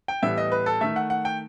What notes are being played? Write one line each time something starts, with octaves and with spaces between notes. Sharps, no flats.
G5
A2 E3 G3 B3 E5
D#5
B4
A4
D#3 A3 E5
F#5
F#5
G5